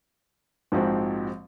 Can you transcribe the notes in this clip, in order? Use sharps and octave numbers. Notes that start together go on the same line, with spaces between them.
A#1 G#2 F3 C4 F#4